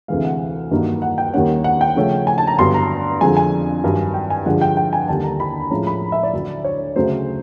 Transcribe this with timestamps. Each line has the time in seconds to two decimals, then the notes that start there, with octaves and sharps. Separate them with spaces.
0.08 D2 C3 E3 G#3 F5
0.25 F#5
0.71 G2 D#3 F#3 A#3 D#4
1.02 F#5
1.18 G5
1.34 D#2 D#3 G3 A#3 C#4 F#5
1.64 F#5
1.81 G5
1.96 C#3 F3 A3 C#4
2.27 G#5
2.38 A5
2.47 A#5
2.58 G2 D3 F#3 B3 C6
2.74 A#5
3.21 F2 D3 F3 G#3 C4 G#5
3.37 G#5
3.83 G2 D#3 F#3
4.14 G5
4.30 G#5
4.46 G2 D3 F3 G#3 F#5
4.61 G5
4.77 G5
4.93 G#5
5.08 D#2 D3 G3 A#3 A5
5.24 A#5
5.40 B5
5.71 A2 F3 G#3 C#4 A#5
5.87 B5
6.12 E5
6.23 D5
6.33 D2 D3 F#3
6.64 C#5
6.96 D2 C#3 F#3 A3 C5